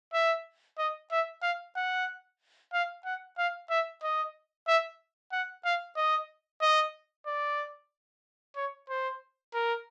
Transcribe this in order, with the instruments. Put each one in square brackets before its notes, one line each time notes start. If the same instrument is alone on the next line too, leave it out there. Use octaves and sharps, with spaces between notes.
[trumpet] E5
D#5
E5
F5
F#5
F5
F#5
F5
E5
D#5
E5
F#5
F5
D#5
D#5
D5
C#5
C5
A#4